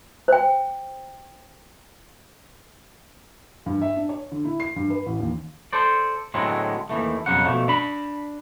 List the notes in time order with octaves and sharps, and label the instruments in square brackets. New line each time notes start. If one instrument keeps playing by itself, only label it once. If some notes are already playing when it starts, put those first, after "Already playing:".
[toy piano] C5 G5
[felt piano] G2
E5
D4
C#5
D3
E4
C7
G2
B4
A1
D#2
[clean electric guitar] A4 C5 D5
A2 D3 F#3 G#3 B3 C4
D#2 E3 A3
B1 F2 C#3 F#3 F#5
B2 F3 A3
D4 B5